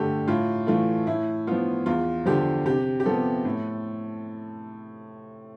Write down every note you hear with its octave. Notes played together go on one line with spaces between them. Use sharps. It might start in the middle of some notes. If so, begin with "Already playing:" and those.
Already playing: G2 D3 A3 G4
A2 F4
E3 A3 F4
A2 E4
F3 B3 F4
E2 F4
D3 F3 G4
C3 G4
G4
F3 B3 A4
A2